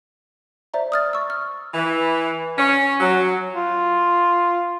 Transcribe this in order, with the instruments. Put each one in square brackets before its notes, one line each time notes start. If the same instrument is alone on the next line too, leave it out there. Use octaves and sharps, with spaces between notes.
[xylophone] C5 D5 E5 A#5
D#6 F6 A6
C#6 E6
F6
[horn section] E3
C#4
F#3
[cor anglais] F4